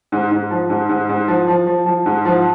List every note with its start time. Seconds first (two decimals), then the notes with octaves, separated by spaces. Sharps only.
0.12 G#2
0.31 G#2
0.51 F3
0.70 G#2
0.89 G#2
1.09 G#2
1.28 F3
1.48 F3
1.67 F3
1.86 F3
2.06 G#2
2.25 F3